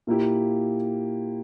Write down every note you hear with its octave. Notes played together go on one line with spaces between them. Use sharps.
A#2 A#3 E4 G4